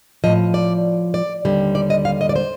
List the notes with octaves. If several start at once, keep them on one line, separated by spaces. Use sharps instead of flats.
A2 F3 D#5
D5
D5
D#2 D3 G3
D5
D#5
F5
D#5
D5
C5